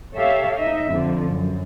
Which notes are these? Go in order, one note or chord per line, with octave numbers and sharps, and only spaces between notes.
G4 A4 C#5 E5 F5
D#4 D#5 E5
F2 D3 F3
F#2